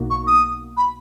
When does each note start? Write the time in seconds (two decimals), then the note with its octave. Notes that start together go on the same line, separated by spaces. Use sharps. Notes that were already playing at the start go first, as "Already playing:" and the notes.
Already playing: B1 B2 A#3 D#4 F#4
0.10 C#6
0.27 D#6
0.77 B5